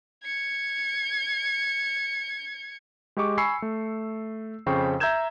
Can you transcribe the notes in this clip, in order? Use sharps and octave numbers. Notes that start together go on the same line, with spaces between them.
G#6 C#7
G#3 G4 D#5 C#6 D6
G#5 B5 C#6 E6 C7 C#7
A3
F2 C#3 C5 G5 C#6 C7
E5 A#5 E6 G6 G#6 E7